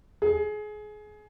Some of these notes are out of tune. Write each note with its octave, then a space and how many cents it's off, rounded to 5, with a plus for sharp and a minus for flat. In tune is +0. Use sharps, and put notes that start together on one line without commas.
G#4 +25